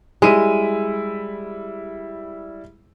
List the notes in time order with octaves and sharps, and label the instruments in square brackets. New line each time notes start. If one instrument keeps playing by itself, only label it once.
[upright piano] G3 E4 D#7 [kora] G#3